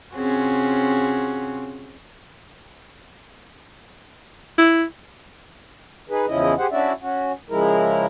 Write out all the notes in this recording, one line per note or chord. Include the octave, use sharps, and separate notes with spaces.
C3 C4 C#4 F4 F#4 G#4
E4
D#4 G#4 B4
E2 C#3 F3 C#4 E4 D#5
G4 G#4 C5 F#5
C#4 D4 E4 F#4 D5 E5
C#4 F#4
C#3 F3 G#3 E4 A#4